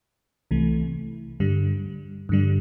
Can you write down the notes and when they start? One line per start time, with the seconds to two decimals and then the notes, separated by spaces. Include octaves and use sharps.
0.51 C2 C3 E3 A3
1.40 G2 D3 G3
2.29 G2 D3 G3